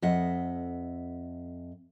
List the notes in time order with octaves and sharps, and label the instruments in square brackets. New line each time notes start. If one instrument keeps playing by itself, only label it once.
[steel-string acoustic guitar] F2 D#5 E5 F#5